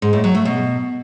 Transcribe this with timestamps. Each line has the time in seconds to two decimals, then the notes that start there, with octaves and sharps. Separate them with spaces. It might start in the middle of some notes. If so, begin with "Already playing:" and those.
0.02 G#2
0.13 A2
0.24 F#3
0.35 A3
0.45 B2